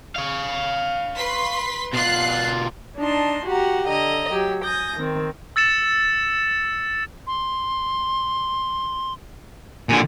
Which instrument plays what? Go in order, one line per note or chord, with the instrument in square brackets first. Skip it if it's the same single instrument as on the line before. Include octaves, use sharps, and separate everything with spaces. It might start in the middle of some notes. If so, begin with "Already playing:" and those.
[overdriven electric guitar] C#5 F5
[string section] B4 C6 B6
[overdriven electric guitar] B2 F4 [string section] F#6 C7
[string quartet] D4 D#4 A5 C6
F#4 G4 F#5 A#5
D3 D#5 A#5
F#3 G4
G#5 D#6 G6 A#6
D#3 C4
[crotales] E6 A6 C#7 E7
[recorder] C6
[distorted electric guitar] A#2 D3 [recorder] G#5